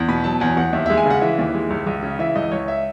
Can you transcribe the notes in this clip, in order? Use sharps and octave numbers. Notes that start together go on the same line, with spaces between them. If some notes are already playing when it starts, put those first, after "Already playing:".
Already playing: E2
B2 B5
F#3 A5
E2 G#5
E2 F#5
D#2 E5
G#3 E5
G#5
C#3 F#5
E3 E5
D#2
G#3
C#2
C#2
C#3
E3 E5
C#2 D#5
C#2 C#5
E5